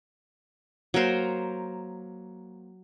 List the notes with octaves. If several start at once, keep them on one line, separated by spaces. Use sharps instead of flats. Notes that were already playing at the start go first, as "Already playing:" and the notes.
F#3 A#3 A#4 C5